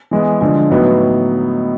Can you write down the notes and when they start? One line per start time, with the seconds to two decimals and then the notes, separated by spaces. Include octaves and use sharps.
0.11 E3 G#3 B3
0.41 D3 F3 G#3
0.70 A2 F#3 B3 D#4